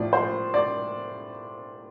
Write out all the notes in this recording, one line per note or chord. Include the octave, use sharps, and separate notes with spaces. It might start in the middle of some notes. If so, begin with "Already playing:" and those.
Already playing: A2 F3 D5
C5
D5